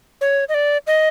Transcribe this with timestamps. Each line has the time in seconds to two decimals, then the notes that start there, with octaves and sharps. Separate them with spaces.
0.21 C#5
0.49 D#5
0.54 D5
0.87 D#5